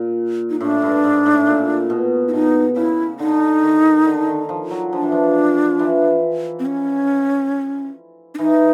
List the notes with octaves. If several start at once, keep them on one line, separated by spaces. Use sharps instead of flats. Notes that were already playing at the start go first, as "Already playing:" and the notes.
Already playing: A#2
D#4
A2 D4
G2
G#2
A2
A#2
B2
E4
B2 D#4
C#3 E4
D3 D#4
D#3
D3
D#3
F3
F#3
F3 D4
E3
F3
E3
C4
C#4
D4
E3 D#4